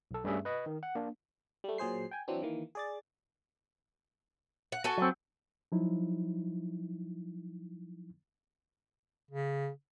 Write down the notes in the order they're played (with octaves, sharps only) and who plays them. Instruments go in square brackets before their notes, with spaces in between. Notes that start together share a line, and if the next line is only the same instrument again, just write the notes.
[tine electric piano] B1 A4
G2 G3 A3 C#4 G#4 E5
B4 D#5
D#3
F#5
A#3 D4
[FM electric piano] G3 A3
A#2 F#3 G#4 C5 C7
G5 G#5
E3 F#3 C4 D4
D#3 E3 A#3
G#4 D5 A6
[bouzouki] F#5
F#4 A4 G#5
[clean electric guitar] F#3 C4
[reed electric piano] F3 F#3 D#4 E4
[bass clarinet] C#3